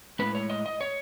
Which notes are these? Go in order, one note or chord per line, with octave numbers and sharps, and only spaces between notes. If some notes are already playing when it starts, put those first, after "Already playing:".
A2 G#3 B4
C#5
D#5
D#5
C#5